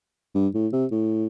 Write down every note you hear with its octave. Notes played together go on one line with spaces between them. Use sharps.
G2
A2
C3
A2